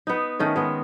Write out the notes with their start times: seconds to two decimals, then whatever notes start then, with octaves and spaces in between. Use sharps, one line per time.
0.07 B3 D#4
0.39 D#3 A3 C#4
0.56 G#3 B3 D#5